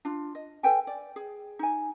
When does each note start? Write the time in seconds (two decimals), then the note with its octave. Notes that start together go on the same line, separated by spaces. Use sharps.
0.05 D4 F4
0.35 D#5
0.63 A4 B4 G5 G#5
0.87 D5
1.16 G#4
1.59 D#4 G#5